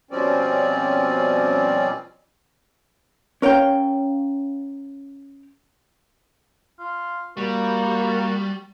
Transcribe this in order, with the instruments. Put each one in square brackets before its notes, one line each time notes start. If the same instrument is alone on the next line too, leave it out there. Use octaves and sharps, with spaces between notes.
[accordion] B2 F3 G3 C4 C#4 D5
[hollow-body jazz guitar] C#4 A#4 C#5 F5 G5
[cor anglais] F4
[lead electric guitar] G3 [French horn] A#3 [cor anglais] F#4